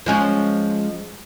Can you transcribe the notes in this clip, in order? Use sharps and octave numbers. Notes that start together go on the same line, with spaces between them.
F3 G#3 C#4